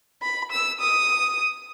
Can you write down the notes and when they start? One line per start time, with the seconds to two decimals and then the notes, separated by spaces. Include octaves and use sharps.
0.22 B5
0.52 E6
0.80 D#6